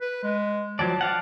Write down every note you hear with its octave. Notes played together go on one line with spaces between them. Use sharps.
B4
G#3
F3 F#3 D5 A5
D5 F5 F#5